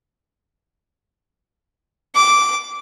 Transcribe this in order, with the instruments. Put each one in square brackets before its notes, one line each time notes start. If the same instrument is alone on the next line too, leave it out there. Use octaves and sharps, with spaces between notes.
[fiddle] D6